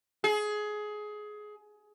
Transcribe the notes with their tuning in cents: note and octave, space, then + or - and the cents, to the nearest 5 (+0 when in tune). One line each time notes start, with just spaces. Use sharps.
G#4 +20